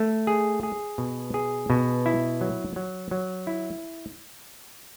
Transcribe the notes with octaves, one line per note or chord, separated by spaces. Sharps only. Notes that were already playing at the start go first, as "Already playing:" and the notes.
Already playing: A3
G#4
G#4
B2
G#4
B2
E4
F#3
F#3
F#3
E4